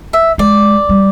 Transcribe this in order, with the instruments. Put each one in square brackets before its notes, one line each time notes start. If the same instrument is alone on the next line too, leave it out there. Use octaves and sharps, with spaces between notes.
[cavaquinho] E5
[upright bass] G#3 [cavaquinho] D5
[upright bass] G3